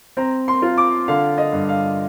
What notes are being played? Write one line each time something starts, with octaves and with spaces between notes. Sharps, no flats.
C4 A#5
C6
F4
D6
D3 F5
D#5
G2
F5